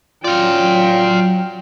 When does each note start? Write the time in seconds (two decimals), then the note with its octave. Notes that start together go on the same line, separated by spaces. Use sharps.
0.24 F#3 C#4 F4 D5 F5 G5